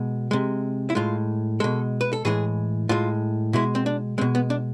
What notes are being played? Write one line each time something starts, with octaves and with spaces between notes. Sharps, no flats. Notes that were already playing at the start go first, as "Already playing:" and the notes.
Already playing: B2 G#3
C3 G#3
E4
A2 G#3 F4
B2 G#3 A4
B4
A4
A2 E3 G#3 G#4
A2 G#3 F4
B2 G#3 E4
C4
D4
B2 G#3 C4
B3
D4